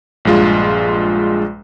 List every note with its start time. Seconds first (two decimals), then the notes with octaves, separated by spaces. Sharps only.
0.25 A#1 G2 G#3 F4